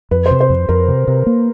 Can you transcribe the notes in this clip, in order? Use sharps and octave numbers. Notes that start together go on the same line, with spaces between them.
F2 B4
C5
C3
C5
F2
F2 A#4
C3
C3
A#3